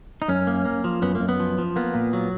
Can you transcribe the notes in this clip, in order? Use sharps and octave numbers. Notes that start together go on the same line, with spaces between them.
D#4
F#2 C#4
A#3
A#3
F3
F#2 B3
A#3
F#2
B3
F3
F3
A#3 B3
A#2
F#3